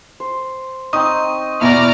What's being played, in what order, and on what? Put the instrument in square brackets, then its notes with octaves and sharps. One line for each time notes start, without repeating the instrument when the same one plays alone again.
[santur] C5
[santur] C4 D#4 [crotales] C#6 [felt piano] D#6
[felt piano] E2 B2 D6 [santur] E4 G#5 [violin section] D5 A#5 F6